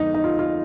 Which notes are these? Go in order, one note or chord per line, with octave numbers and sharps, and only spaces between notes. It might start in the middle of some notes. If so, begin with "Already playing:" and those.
Already playing: F2 D3 G#3 B3 D#4
D#4
F4
F4